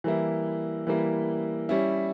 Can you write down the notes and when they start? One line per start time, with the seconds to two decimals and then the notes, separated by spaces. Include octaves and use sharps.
0.04 E3 G3 A#3 E4
0.87 E3 G3 A#3 E4
1.69 G3 C#4 E4